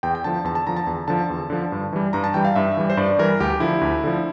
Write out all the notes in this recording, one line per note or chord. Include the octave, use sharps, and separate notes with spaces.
E2 G5
G5
D3 F3 A5
E2 A5
A5
D3 F3 A#5
A5
E2
D3 F3 A5
E2
D3 F3
G2
E3 G3
G2 A#5
A5
E3 G3 G5
F5
G2 E5
E3 G3
C5
G2 D5
E3 G3 A#4
D2 G4
D3 F3 E4
D2
D3 F3